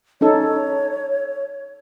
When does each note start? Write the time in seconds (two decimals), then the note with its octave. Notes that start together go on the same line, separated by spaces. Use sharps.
0.21 C#4 D#4 A4 C#5